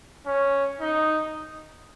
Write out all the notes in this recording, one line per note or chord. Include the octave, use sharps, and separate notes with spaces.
C#4
D#4